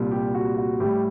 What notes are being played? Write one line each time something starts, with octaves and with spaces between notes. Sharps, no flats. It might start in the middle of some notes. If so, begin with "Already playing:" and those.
Already playing: C2 A#2 G3
G4
F#4
F#4
A2 G3 G4